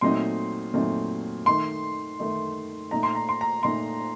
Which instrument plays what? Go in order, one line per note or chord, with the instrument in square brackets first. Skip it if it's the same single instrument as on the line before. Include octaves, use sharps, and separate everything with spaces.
[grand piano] A#2 F#3 A3 C4 D#4 [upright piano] C6
[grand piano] A#2 F#3 A3 C4 D#4
[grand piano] D#3 A3 D#4 [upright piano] C6
[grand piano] D#3 A3 D#4
[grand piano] A#2 A3 D#4 [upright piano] A#5
[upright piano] C6
A#5
C6
A#5
[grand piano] A#2 A3 D#4 [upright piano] C6